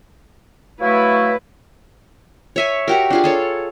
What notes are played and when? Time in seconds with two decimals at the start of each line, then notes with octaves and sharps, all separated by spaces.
0.81 F#3 A3 E4 B4 F5
2.56 C#5 E5 G#5
2.88 F#4 G4 A#4
3.10 D4 F4 G#4
3.24 G#4 A4 C#5